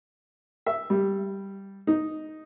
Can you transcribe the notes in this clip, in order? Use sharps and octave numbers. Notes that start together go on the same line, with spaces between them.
E5
G3
D#4